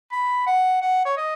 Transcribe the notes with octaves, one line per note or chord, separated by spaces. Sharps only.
B5
F#5
F#5
C#5
D#5